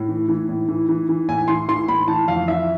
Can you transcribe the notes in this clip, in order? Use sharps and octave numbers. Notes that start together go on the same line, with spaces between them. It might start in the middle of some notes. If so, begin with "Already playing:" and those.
Already playing: A2
E3
E3
A2
E3
E3
E3
A2 G#5
E3 C6
E3 C6
A2 B5
E3 A5
F2 F5
E3 E5